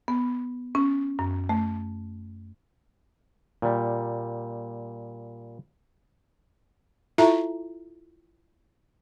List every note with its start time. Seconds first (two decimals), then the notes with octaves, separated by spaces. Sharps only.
0.08 B3
0.75 C#4
1.19 F#2
1.49 A3
3.62 A#2 G3
7.18 E4 F4 A4 E5 A5 A#5